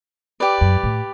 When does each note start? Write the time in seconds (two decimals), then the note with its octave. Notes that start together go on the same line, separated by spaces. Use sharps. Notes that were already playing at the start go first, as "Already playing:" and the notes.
0.40 G4 B4 D5
0.61 F#2
0.83 A2